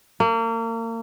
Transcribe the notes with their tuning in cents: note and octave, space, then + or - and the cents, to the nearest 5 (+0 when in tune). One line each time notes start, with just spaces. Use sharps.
A#3 -35